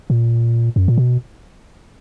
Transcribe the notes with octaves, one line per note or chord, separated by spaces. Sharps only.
A#2
F#2
A#2
B2